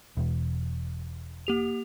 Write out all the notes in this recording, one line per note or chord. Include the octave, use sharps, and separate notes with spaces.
E1
A#3 G4 F7